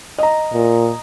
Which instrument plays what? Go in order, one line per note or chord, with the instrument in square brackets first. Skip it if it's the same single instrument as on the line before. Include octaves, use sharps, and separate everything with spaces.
[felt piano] D#5 A#5
[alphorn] A#2